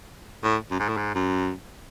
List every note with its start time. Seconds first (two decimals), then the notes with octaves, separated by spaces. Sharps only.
0.44 A2
0.71 F#2
0.80 G#2
0.89 A2
0.97 G#2
1.15 F#2